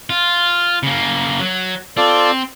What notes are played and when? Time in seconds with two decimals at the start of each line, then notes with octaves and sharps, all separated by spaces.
0.10 F4
0.83 C#3 A#3
1.40 F#3
1.97 C4 F4 A4 D5